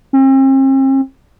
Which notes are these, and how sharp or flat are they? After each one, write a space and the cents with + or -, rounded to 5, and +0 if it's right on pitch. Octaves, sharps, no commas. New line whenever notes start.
C4 +45